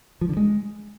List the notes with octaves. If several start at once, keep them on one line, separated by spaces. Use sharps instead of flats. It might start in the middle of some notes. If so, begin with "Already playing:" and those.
F3
D3
G#3